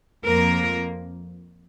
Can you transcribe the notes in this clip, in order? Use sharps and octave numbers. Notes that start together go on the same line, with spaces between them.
F2 F3 A#3 A#4